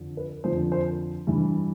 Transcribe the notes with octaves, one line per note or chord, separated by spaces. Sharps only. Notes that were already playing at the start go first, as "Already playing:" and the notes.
Already playing: F2 D3 F3
B4
F2 D3 F3 C5
C5
G2 E3